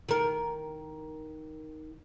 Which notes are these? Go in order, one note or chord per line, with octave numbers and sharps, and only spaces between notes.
D#3 A#4